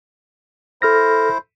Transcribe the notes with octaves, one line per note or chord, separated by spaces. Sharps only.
E4 A4 C5 F6 A#6